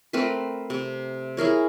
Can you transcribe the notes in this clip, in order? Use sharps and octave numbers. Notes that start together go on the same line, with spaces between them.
A3 C4 A#4 B4
C3
E4 G#4 A#4 C#5